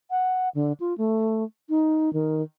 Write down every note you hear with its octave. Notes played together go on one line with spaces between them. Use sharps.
F#5
D3
F4
A3
D#4
D#3